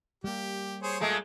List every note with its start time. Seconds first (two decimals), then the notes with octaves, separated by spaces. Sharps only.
0.24 G3 A#3 G4
0.83 G#4 C5 C#5
1.00 A#2 G#3 A3 G#4